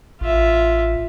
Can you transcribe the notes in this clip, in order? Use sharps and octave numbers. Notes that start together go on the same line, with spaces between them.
A1 F4 E5